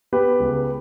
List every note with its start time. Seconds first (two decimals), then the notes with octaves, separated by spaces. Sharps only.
0.12 B3 G4 B4
0.40 C#2